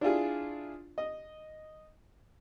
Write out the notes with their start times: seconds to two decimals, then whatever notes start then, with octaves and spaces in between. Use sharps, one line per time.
0.01 D4 E4 F4 G#4
0.98 D#5